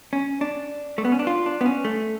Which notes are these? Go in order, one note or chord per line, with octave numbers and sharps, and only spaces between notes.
C#4
D4
A3
B3
C#4
D4
F4
D4
B3
C#4
A3